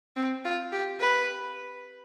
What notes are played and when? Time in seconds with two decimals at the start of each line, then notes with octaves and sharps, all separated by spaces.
0.16 C4
0.45 F4
0.72 G4
1.00 B4